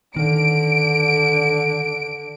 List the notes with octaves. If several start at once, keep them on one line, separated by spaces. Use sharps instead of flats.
D3 D#3 D7